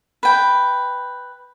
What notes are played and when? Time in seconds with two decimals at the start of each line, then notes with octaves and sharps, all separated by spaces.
0.23 B4 G5